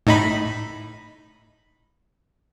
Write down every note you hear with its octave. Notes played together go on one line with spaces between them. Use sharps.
A2 D#4 B5